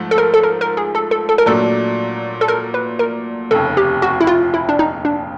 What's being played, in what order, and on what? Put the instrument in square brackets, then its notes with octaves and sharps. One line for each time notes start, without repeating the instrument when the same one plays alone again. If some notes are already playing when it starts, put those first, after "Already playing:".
Already playing: [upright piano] G#2 F3 A3
[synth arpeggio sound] A4
A#4
A4
A#4
A#4
G#4
A4
A4
A4
A#4
[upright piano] A#2 F#3 A3 D4 [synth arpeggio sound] A4
[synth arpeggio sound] A4
A#4
B4
A#4
[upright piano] F1 D#2 C#3 [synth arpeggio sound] A4
[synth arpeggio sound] G4
F#4
E4
F4
E4
D4
D#4
D4